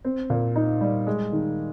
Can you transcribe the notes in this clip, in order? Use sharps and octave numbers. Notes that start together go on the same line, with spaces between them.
C4
A#2
D#4
G3
G#3
D#3